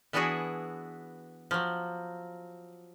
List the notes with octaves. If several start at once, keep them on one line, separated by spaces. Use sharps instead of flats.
E3 B3 D4 E4 F#4 G#4
F3 F#3